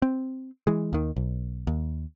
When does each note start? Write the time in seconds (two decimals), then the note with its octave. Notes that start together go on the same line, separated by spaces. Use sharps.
0.02 C4
0.67 E3 G#3
0.93 D#2 D#3
1.16 B1
1.67 D#2